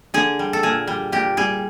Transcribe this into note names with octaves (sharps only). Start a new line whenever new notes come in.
D3 G#4
G3
A4
A#2 G#4
G3
A#2 G4
G3 G#4